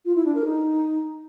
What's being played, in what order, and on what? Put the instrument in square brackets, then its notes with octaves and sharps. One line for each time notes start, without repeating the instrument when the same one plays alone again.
[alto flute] F4
E4
D4
A#4
D#4